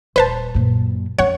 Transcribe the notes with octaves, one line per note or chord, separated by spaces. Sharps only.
D#1 B4 C5 A5
F#2 A#2
F2 C#4 C#5 F#5